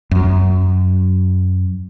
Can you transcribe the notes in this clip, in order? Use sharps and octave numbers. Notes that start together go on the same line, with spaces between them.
F#2 F#3